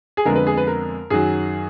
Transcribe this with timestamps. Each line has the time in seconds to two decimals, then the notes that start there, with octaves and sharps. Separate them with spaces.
0.17 G#4
0.25 F2 D3 G#3 B3 A#4
0.36 B4
0.47 G#4
0.57 B4
0.67 A#4
1.10 F#2 D#3 F#3 G#4